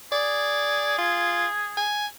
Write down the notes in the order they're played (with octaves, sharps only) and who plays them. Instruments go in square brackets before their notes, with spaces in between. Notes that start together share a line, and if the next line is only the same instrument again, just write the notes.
[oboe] G#4 [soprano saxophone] D5
[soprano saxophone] F4
G#5